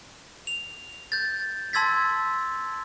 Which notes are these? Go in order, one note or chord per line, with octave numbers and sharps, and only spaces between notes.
F7
G6 A6
A5 C6 E6 G#6 A6 B6